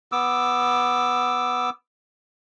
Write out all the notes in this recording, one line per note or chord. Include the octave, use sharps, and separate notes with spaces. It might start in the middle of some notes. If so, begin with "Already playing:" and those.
B3 D6 E6